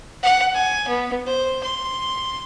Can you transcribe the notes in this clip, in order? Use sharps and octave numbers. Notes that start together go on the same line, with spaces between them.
F#5
G#5
B3
C5
C6